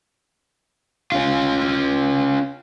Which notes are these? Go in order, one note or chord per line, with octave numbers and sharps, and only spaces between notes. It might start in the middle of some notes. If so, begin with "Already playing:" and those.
C#4 F4